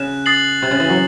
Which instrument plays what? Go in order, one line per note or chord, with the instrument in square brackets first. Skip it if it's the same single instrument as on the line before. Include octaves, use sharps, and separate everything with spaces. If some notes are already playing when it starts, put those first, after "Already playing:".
Already playing: [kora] C#3 [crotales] F#6 E7
[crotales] D#6 A6 C7 F#7
[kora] C3
C#3
E3
F#3